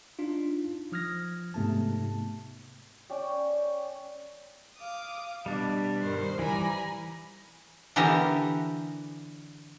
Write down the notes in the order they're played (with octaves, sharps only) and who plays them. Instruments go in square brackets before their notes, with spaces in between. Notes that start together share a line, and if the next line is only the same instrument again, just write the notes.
[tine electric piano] D4 D#4 F4
F3 D#6 F6 G#6 A#6
G#2 C3 A3 B3 A5
[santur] C#4 D5 G5
[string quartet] F5 D6 D#6
[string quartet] B2 [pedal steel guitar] G3 D4
[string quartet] G2 D#3 C5
[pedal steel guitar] E3 G3 [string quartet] G#5 A#5 B5
[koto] D3 E3 B3 G4 A4 A#4